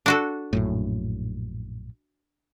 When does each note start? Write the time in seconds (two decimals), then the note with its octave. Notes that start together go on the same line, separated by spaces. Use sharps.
0.06 D4 F#4 A4
0.53 A#1 F#2 A2